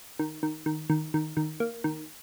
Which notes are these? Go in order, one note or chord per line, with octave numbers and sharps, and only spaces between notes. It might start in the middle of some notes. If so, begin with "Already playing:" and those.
D#3
D#3
D#3
D#3
D#3
D#3
A#3
D#3